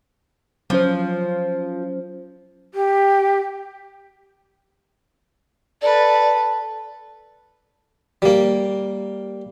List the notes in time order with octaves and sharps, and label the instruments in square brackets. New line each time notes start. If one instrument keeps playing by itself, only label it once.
[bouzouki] F3 [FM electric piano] F#3 C#4 C5
[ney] G4
[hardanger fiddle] A4 B4 [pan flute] D5
[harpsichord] G3 A#3